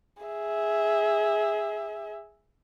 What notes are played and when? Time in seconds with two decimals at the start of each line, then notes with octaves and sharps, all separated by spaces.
0.23 G#4 E5